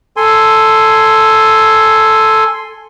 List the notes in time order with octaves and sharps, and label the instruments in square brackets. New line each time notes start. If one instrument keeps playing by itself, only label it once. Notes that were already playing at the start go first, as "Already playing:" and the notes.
[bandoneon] A4 G#5 C6